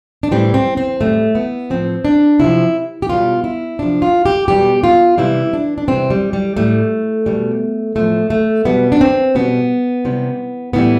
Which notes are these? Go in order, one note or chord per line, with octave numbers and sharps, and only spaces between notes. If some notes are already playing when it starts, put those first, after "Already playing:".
D4
A2 E3 G3 C4
C4
C4
A2 G3 A3
B3
A2 F3 C4
D4
C3 F3 E4
G4
B2 G3 F4
E4
C3 F3 D4
F4
G4
B2 G3 G4
F4
C3 E3 G3 E4
D4
D4
C3 E3 G3 C4
G3
G3
A2 G3 A3
B2 G3
A2 F3 A3
A3
B2 G3 B3
D4
C4
B2 G3 B3
C3 E3 G3
A2 E3 G3 B3